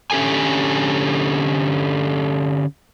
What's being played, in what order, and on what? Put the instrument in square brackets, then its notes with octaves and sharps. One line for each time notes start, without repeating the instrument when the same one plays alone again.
[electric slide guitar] D3 C#4 G4 A4 G#5